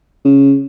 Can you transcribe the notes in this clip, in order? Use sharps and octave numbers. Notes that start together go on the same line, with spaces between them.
C#3